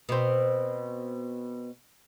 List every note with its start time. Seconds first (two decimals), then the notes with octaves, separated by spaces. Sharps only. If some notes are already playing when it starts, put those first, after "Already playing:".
0.09 B2 C4